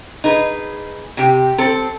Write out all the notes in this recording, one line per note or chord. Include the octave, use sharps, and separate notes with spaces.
D#4 G#4 B4
C3 G4
C4 A4